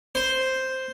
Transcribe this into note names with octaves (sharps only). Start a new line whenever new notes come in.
C5